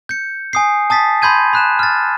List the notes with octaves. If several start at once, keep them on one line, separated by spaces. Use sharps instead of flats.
G6 C#7
G#5 D#6 C7
A5 D#6 A6 B6
B5 C6 G6 G#6 D#7
B5 F#6 E7
F6 A6